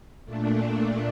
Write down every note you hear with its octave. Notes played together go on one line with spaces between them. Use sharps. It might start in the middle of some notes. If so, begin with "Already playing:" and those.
A#2 A3 D4